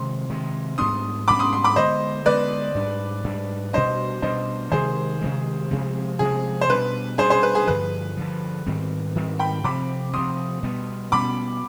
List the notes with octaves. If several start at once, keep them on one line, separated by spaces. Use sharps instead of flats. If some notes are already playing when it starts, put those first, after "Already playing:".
Already playing: C3 D#3 G#3 C6
C3 D#3 G#3
G#2 G3 B3 D4 C6 D#6
G#2 G3 B3 D4 B5 D6
C6 D#6
C6
B5 D6
D3 G#3 B3 C5 D#5
D3 G#3 B3 B4 D5
G#2 G3 D4
G#2 G3 D4
B2 G3 D4 C5 D#5
B2 G3 D4 C5 D#5
C3 D#3 G#3 G#4 C5
C3 D#3 G#3
C3 F3 G#3 C4
C3 F3 G#3 C4 G#4
C5
B2 G3 D4 B4
B2 G3 D4 G#4 C5
G#4 C5
B4
G#4
G2 D3 F3 B4
G2 D3 F3
G#2 D#3 G3 C4
G#2 D#3 G3 C4
G5 B5
C3 F3 C4 B5 D6
C3 F3 C4 C6 D#6
B2 G3 B3
B2 G3 B3 B5 D6